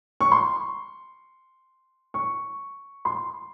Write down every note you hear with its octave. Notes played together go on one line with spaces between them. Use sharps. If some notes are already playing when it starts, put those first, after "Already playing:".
C#6
C6
C#6
C6